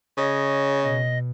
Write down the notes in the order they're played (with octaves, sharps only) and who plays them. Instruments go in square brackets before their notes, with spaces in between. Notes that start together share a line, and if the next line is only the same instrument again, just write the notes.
[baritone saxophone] C#3 [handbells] C#5 D#6 [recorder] D#5
[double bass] B2 [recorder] D#5